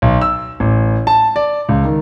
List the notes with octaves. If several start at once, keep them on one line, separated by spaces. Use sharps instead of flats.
B1
E6
A1
A5
D5
C#2
D#3